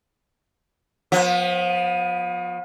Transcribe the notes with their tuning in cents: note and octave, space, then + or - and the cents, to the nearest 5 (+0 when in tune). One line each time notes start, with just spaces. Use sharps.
F3 +35 B3 +0